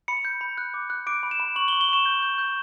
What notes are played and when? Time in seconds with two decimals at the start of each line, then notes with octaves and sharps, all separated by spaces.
0.08 B5 C#7
0.25 G6
0.41 B5
0.58 F#6
0.74 D6
0.90 F#6
1.07 D6 D7
1.23 B5
1.31 E7
1.40 B5
1.56 C#6 F#7
1.68 G7
1.73 C#6
1.81 G7
1.89 C#6 E7
2.06 G6
2.22 G6
2.38 G6